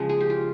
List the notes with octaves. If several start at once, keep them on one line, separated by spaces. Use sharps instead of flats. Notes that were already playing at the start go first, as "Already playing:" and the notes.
Already playing: C#3 F3 G#3
G#4
G4
F4